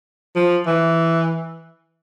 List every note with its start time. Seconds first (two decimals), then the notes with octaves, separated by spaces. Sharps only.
0.36 F3
0.67 E3